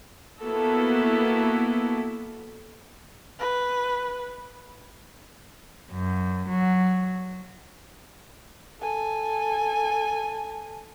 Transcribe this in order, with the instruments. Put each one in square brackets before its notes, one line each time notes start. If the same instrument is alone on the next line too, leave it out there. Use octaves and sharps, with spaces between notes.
[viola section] A#3 B3 E4 F#4 A4
[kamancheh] B4
[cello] F#2
F#3
[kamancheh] A4 G#5